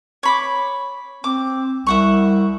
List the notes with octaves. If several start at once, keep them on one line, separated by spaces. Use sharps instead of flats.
C#5 B5 D6
C4 D6
C2 E5 F#5 C#6